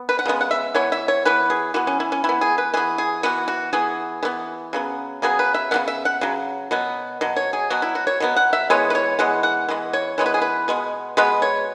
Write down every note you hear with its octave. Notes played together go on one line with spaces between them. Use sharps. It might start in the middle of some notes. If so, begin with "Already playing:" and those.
Already playing: B3
B4
F#5
C#3 G#3 B3
F#5
E5
E3 B3 C#5
E5
C#5
E3 B3 B4
G#4
E3 B3 F#4
C#4
E4
C#4
E3 B3 E4
G#4
B4
E3 B3 G#4
G#4
E3 B3 F#4
F#4
E3 B3 G#4
E3 B3
C#3 F#3 B3
C#3 F#3 B3 G#4
B4
E5
C#3 F#3 B3 F#5
E5
F#5
C#3 F#3
B2 F#3 B3
B2 F#3
C#5
G#4
B2 F#3 B3 F#4
E4
F#4
C#5
B2 F#3 B3
F#5
E5
E3 G#3 B3 C#5
B4
C#5
E3 G#3 B3 F#5
F#5
E3 G#3 B3
C#5
E3 G#3 B3 C#5
B4
G#4
B4
B2 G#3 B3
B2 G#3 B3 B4
C#5